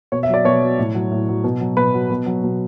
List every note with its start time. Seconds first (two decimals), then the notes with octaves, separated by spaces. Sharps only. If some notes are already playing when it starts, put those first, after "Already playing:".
0.12 B2 C#5
0.23 E5
0.29 F#3 D5
0.45 B2 C#5
0.62 F#3
0.79 A2
0.94 F#3
1.11 A2
1.28 F#3
1.44 B2
1.60 F#3
1.77 B2 B4
1.94 F#3
2.10 B2
2.26 F#3
2.43 B2